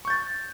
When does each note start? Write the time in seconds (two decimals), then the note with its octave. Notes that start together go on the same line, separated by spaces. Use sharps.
0.05 C#6
0.08 G6
0.10 A6